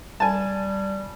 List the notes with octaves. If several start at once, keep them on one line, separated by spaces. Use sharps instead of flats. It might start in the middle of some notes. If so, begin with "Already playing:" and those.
G3 G#5 A5